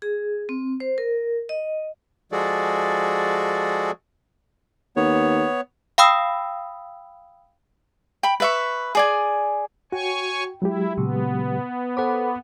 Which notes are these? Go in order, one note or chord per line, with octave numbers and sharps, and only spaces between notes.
G#4
C4
C5
A#4
D#5
F3 G#3 F#4 G#4 A4 D5
D#2 B3 C#5
F5 G5 B5 D#6 E6
G5 B5
B4 E5 C#6
G#4 D5 G#5
F#4 C#5 G5 G#5 C#6
F#3 G#3 E4 G4
A#2 C#3 B3
A4 C5 F#5 B5 D6